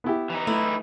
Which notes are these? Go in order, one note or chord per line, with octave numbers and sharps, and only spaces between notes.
B3 E4 G4
E3 D#4
A3 E4